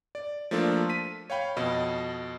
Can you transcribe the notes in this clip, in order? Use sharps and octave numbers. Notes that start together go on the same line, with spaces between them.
D5
F3 A3 A#3 D4 F4 A4
B6 D#7
C#5 F5 G5 B5
F2 B2 D#5